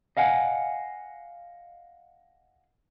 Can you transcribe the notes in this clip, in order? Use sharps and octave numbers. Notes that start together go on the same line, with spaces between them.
D#5 F5 F#5 G#5